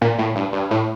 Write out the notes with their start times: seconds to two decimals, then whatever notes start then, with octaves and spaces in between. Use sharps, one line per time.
0.01 A#2
0.18 A2
0.35 G2
0.53 G2
0.71 A2